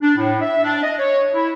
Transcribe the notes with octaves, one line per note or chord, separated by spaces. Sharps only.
D4
A2
E5
D4
D#5
C#5
E4